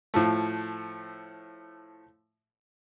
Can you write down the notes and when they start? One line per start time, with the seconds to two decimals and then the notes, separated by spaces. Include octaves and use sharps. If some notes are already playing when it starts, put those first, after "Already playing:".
0.14 A2 F3 A3